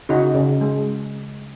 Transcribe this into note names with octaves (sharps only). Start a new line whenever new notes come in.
C#3 D#4 F#4
C#3
G#3